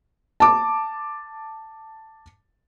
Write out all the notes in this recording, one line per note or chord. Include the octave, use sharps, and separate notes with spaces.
A5 D6